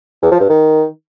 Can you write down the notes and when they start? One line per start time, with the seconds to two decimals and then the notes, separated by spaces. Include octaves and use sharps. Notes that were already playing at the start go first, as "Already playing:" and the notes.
0.22 E2
0.31 F3
0.40 G2
0.49 D#3